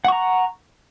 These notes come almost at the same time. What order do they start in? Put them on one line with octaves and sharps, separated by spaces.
F#5 C#6 A#5